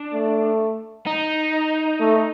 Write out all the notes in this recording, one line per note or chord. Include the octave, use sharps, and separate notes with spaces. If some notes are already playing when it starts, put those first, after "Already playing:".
Already playing: D4
A3
D#4
A3